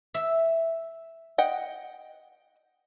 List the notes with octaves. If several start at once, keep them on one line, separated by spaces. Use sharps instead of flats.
E5
D#5 F#5 G5